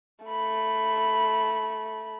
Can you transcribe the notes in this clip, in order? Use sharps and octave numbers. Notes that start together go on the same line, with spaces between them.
A3 B5